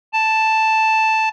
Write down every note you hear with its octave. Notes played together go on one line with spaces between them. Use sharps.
A5